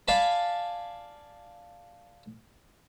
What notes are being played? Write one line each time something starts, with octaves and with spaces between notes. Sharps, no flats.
D5 F5 G#5 A5 B5